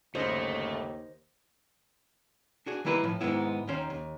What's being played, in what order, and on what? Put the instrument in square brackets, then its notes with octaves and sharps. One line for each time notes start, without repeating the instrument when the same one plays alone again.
[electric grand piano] G1 C#3 A#6 [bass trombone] D#2 [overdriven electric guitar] A3 [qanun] C5 C#5 D#5
[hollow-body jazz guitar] D4 F#4 G#4
D#3 G3 A#3 E4 A#4 B4
A2 F3
G#2 C3 D#3 G#3 B3 E4
D#2 D#3 C#4 C5 A#5
D#2